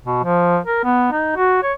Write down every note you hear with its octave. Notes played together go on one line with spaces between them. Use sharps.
B2
F3
A#4
B3
D#4
F#4
C#5